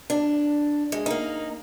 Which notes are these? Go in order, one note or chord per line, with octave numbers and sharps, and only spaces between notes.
D4
G#3
A#3 D#4